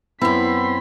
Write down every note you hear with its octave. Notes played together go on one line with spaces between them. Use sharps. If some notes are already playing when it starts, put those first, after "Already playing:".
F#2 B3 C4 E4 C6 B6